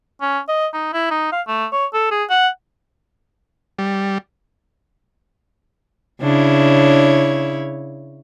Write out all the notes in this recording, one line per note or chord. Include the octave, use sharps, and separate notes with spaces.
C#4
D#5
D#4
E4
D#4
F5
A3
C#5
A4
G#4
F#5
G3
C#3 D4 E4 C#5